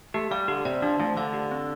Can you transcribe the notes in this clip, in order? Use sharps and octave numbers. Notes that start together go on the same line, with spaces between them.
A3 G4
G3 F5
D3 G4
C3 D5
F3 D4
F3 A3
D3 F5
G4
C4